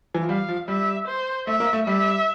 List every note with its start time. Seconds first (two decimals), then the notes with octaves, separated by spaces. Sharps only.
0.14 E3
0.22 F3
0.29 G3 F5
0.48 F3
0.68 G3 E5
1.07 C5
1.47 A3 E5
1.60 A#3
1.73 A3
1.86 G3 E5